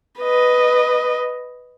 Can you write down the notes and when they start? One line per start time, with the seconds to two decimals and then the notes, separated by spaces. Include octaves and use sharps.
0.20 B4 D#5